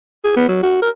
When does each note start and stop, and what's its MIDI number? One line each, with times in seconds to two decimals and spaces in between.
0.25 0.34 68
0.37 0.47 59
0.48 0.63 54
0.63 0.78 66
0.82 0.89 70